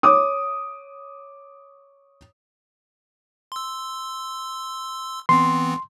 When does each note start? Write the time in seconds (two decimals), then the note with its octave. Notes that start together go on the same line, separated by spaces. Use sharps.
0.03 C#5 D6 D#6
3.52 C6 E6
5.29 E3 B3 C4 C6